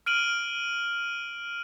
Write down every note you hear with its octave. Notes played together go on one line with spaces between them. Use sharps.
F6 D7 D#7 F#7